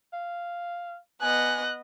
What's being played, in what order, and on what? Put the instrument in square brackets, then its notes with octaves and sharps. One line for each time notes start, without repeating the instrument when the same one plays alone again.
[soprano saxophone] F5
[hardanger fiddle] B3 D#5 [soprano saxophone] G#5 [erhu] F#6